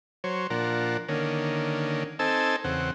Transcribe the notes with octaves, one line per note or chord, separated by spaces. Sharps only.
F#3 C5 C#5
A#2 F3 D4 A#4 F#5
D3 D#3 A#3 C#4
C4 D#4 A4 G#5 A5 E6
E2 C#3 C4 F#5